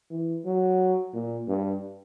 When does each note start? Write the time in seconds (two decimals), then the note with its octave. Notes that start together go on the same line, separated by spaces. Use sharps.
0.10 E3
0.45 F#3
1.14 A#2
1.48 G2